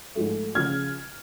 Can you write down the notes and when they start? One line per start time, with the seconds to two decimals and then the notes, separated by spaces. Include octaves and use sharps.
0.15 G#2 F3 A3
0.55 C#3 F3 F6 G#6